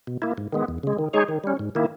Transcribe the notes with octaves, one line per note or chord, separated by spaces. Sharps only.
B2
A#3 E4
G#2
D#3 G#3 B3
E2
C#3 G#3
D#3
G#3 D#4 G#4 C#5
D#3
G3 C#4
G#2
D#3 A#3 E4